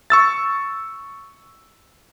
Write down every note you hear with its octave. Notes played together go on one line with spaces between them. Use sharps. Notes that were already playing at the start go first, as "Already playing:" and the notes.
C#6 E6 A6